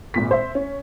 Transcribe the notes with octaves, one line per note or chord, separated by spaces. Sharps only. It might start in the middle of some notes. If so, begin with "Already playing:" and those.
G#1 A#2 B6
C5 E5
C#4